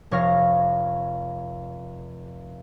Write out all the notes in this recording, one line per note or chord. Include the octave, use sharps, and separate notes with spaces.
F1 C#5 F5 A#6